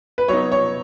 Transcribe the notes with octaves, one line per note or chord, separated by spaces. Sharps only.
B4
F#3 B3 D#4 C#5
C#5